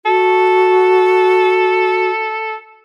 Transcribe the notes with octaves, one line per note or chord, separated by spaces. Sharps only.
F#4 A4